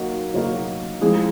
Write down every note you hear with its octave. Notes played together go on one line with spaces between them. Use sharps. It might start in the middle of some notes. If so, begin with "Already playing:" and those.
Already playing: F#3 A#3 D#4 F#4 A#4
F#3 A#3 D#4 F#4 A#4
F3 G#3 C4 E4 G#4